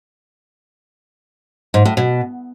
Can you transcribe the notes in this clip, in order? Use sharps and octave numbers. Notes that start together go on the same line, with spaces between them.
G#2
A2
B2